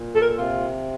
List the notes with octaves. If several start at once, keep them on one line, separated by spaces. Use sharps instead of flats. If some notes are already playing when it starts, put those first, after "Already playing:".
Already playing: A#2
A4
A#4
A4
C3 F4